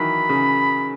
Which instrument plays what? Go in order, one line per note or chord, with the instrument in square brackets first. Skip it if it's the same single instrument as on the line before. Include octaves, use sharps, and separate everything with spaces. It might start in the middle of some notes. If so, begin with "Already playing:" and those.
Already playing: [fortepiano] D#3 E3 F#3 [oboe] B5
[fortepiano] C#3